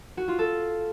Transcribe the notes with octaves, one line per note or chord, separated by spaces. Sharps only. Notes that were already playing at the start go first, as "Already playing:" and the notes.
F#4
F4
A4